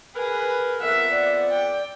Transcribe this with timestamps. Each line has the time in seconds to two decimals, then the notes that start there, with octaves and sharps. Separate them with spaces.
0.15 G#4 A#4 B4
0.81 F2 B3 A#4 E5 F#5
1.10 D5
1.51 G5